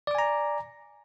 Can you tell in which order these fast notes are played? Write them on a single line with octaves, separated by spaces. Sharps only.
D5 D6 G#5 A#5